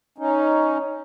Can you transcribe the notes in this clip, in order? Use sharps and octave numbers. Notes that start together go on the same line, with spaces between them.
C#4 D#4